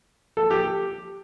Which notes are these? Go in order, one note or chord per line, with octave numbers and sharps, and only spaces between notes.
A4
G4